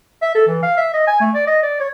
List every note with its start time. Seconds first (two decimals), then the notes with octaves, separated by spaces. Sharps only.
0.22 E5
0.35 A4
0.47 E3
0.63 F5
0.77 E5
0.94 D#5
1.07 G#5
1.21 A3
1.34 D5
1.47 D#5
1.63 D5
1.80 C#5